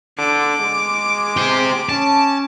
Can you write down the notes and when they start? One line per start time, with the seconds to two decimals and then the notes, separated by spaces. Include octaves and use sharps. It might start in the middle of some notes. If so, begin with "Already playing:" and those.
0.18 D3 D6
0.60 G#3
1.37 G4 C5
1.89 C#4 A5